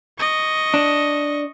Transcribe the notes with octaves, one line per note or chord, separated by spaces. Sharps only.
D#5 C#6
D4